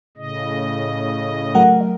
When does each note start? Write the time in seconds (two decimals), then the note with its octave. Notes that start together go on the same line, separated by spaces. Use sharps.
0.17 A2 C#3 D#5
1.55 F#3 A3 A#4 F#5